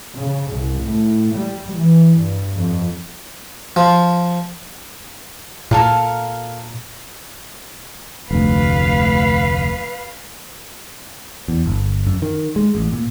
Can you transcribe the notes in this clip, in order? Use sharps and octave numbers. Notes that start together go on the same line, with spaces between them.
C#3
C2
A2
G3
E3
G2
F2
F3
A#2 A4 A#4 F5
F1 D2 B4 F5
E2
G1
F#2
D#3
G#3
A1
A#2